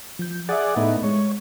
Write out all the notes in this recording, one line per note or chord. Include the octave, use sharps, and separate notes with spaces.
F3 G6
G#4 D5 E5 F#5 D#6 A6
A2 B3 D#4
G#3 C#5